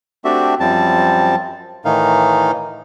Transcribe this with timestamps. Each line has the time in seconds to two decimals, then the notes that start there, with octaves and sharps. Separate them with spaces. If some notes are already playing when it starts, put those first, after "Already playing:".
0.25 A3 C4 D4 F#4 G4 E5
0.60 F#2 F3 G3 C4 A5
1.85 A2 D#3 E3 D#4 F5